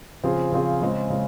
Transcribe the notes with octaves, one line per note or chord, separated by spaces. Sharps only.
C#3 F3 C4 F4 G#4
C#3 F3 C4 F4 G#4
C#3 G#3 C4
C#3 G#3